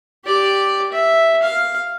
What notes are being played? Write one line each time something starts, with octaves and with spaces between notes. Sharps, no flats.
G4 D5
E5
F5